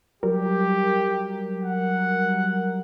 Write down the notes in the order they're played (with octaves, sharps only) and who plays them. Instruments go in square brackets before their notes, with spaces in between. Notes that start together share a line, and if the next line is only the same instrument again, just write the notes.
[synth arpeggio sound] F#3 G3 A#4 [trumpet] G4
[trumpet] F#5